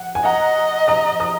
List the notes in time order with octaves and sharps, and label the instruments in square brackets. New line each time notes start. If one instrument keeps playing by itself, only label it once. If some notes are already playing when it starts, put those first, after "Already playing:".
Already playing: [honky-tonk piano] F#5
G#5
[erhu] D#5 [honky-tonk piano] F#5 A#5
[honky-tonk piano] A#5 D#6
A#5 D#6